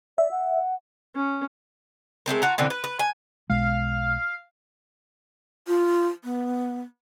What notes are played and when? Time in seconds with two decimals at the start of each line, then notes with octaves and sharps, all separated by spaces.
0.18 D5 E5
0.31 F#5
1.15 C#4
2.26 G#3 A3 C4 A#4
2.42 F4 F#4 A#5
2.58 B2 D3 E3 C4
2.70 B4
2.84 B4
2.99 G#5
3.50 B1 B2 G#3 F5
5.68 F4
6.24 B3